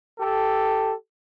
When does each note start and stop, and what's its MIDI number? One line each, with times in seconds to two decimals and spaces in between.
0.19 0.92 67
0.19 0.92 69